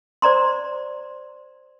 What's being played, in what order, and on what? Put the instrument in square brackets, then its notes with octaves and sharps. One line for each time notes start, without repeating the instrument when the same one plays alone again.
[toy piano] C5 D5 A#5 C6